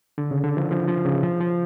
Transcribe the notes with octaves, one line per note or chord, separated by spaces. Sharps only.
D3
C#3
D3
F3
F3
F3
C#3
F3
F3